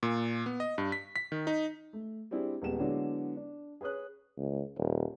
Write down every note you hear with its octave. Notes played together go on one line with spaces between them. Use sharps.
A#2
B3
D#5
G2
B6
B6
D#3
D#4
A3
G3 C4 D4 E4 G#4
D#1 G3 G#3 B3 E7
D3 F#3 G#3 B3 D4 E4
D4
G#4 B4 C#5 D#6 F#6
C#2
D#1